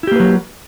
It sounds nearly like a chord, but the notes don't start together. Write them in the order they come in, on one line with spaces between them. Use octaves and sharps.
E4 G4 A#3 B4 F#3